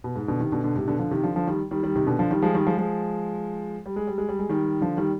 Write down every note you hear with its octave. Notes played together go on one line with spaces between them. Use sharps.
B2
G#2
B2 D3
C3 D#3
B2 D3
B2 D3
G#2 C3
B2 D3
D3 F3
C3 D#3
D3 F3
D3 F3
D#3 G3
D#3 G3
D#3 G3
C3 D#3
B2 D3
D3 F3
D#3 G3
F3 G#3
D#3 G3
F3 G#3
F3 G#3
G3
G#3
G3
G#3
G3
G#3
D#3 G3
D3 F3
D#3 G3